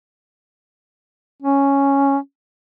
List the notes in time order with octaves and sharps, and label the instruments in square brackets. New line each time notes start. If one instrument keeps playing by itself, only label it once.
[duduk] C#4